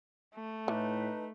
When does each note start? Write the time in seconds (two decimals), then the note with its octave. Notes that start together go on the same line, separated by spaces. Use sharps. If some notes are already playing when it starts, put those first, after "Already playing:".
0.35 A3
0.68 A2 E3 D#4 B4